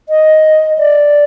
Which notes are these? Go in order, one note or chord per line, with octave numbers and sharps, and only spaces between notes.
D#5
D5